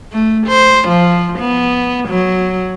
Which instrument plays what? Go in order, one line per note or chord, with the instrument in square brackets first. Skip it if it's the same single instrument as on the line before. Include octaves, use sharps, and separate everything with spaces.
[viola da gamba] A3
C5
F3
B3
F#3